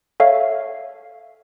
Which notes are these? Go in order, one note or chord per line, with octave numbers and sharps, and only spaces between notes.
A4 C#5 E5 F5